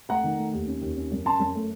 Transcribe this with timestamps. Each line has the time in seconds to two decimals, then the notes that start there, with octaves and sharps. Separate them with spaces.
0.09 A3 F#5 A#5
0.24 D#3
0.38 A3
0.53 D#2
0.67 C#4
0.81 D#2
0.96 C#4
1.12 F#2
1.26 C#4 A5 C6
1.40 F#2
1.55 A3